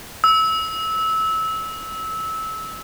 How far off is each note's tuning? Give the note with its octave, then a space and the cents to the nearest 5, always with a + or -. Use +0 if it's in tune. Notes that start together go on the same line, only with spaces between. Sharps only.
E6 -20